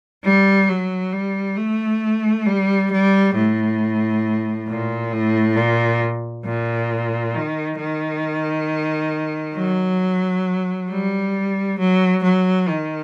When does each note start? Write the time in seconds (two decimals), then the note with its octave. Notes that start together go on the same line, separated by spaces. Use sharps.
0.24 G3
0.69 F#3
1.12 G3
1.56 A3
2.46 G3
2.91 G3
3.35 A2
4.68 A#2
5.12 A2
5.57 A#2
6.46 A#2
7.34 D#3
7.80 D#3
9.56 F#3
10.90 G3
11.79 F#3
12.23 F#3
12.68 D#3